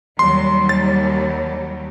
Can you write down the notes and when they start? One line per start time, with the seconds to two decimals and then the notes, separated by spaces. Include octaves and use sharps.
0.19 D#2 F#3 G3 C6
0.69 A6